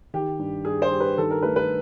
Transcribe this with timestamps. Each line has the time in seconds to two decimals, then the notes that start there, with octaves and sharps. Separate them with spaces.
0.14 D#3 G4
0.39 G2
0.65 G2 G#4
0.82 C5
0.91 G3
1.00 B4
1.17 D#3 A4
1.30 A#4
1.42 A3 B4
1.56 B4